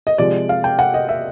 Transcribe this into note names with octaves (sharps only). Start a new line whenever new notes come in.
D#5
C3 F3 G#3 D5
F5
G5
F#5
D#5
E5